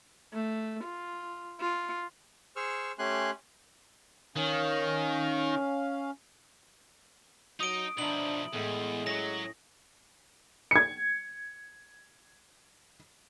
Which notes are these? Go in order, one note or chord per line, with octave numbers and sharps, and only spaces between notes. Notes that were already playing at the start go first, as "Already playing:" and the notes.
A3
F4
F4
G#4 C5 C#6 E6 F6
A3 C#4 G4 G#5 C6 F#6
D#3 C#4 F5
F#3 D#4 D#5 D#6 D7
B2 F3 D4 E5 A#5 B5 F#7
E2 A2 G#3
F#3 C#4 C#5 A#6
G#6 C#7